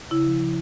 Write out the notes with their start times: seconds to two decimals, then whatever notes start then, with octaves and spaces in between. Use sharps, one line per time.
0.11 C#3 E4
0.26 F3
0.41 F3